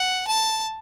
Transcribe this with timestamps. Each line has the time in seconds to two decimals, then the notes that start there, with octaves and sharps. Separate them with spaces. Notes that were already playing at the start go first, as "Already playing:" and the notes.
Already playing: F#5
0.27 A5